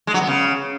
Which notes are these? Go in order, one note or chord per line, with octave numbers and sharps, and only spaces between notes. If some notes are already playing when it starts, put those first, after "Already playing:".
G#3
F#3
B3
C#3